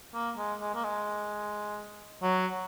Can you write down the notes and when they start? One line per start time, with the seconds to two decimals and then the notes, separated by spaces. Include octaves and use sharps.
0.15 A#3
0.38 G#3
0.61 G#3
0.75 A#3
0.84 G#3
2.23 F#3